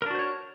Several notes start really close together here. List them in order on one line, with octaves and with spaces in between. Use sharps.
A#4 D4 F#4 C5 C#5